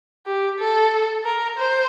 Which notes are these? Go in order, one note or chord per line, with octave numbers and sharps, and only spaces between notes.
G4
A4
A#4
C5